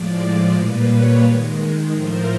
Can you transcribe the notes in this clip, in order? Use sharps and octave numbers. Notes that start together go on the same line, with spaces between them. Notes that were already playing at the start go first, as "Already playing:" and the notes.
Already playing: A2 F3 G#3 D5
A#2 G3 A#3 B4 C#5
B4 C#5
D#3 G#3
A2 F3 A3 A#4 C5